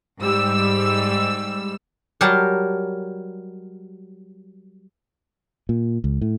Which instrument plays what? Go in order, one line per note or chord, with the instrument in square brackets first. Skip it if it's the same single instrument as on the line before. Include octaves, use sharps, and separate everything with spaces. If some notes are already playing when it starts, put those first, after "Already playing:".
[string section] G#2 G3 E6
[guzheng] F#3 G3 G4 A#4 A5 A#5
[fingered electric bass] A#2
C#2
A2